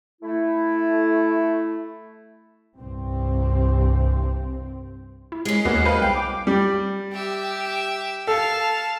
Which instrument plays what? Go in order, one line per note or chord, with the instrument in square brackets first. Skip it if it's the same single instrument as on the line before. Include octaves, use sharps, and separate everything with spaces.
[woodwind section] A3 E4
[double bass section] C2 G2 C4
[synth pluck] E4
[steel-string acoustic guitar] G#3 C#4 [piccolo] C7
[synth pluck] D#2 B4 C#5 [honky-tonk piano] A#3 B3 F#4
[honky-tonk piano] B4 F5 B5 [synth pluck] C5
[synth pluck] C2 [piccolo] F5 [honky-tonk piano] G5
[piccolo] D6
[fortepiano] G3
[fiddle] G4 E5
[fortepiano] A4 [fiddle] F5 A5